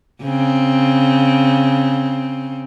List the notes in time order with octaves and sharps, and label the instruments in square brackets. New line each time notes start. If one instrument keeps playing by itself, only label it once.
[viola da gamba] C#3 C4